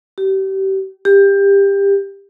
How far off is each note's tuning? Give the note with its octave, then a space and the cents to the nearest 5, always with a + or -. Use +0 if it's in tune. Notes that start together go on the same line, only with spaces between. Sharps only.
G4 -30
G4 +20